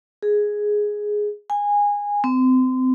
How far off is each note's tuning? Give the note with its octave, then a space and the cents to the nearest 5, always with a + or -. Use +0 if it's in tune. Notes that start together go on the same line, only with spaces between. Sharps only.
G#4 +5
G#5 -20
C4 -30